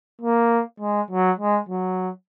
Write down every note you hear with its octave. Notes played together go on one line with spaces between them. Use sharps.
A#3
G#3
F#3
G#3
F#3